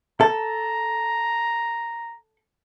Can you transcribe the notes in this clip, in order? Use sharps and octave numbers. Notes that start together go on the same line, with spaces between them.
A4 A#5